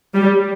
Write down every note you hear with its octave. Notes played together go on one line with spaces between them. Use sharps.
G3